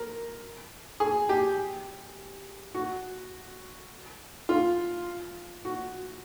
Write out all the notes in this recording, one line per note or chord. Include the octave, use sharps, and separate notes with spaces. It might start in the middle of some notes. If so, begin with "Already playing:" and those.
Already playing: A#4
G#4
G4
F#4
F4
F#4